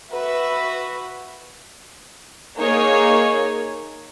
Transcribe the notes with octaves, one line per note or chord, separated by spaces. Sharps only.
F#4 B4 E5
A#3 D#4 G#4 C#5